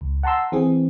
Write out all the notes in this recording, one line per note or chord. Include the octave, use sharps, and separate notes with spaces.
C#2
F#5 A5 A#5 C6 E6
E3 C4 G#4